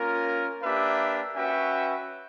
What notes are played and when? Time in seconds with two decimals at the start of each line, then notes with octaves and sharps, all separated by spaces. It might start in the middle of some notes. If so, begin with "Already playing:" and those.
Already playing: A#3 C#4 F4 A#4
0.62 A#3 D4 G4 B4 E5
1.36 C#4 F#4 B4 E5 G5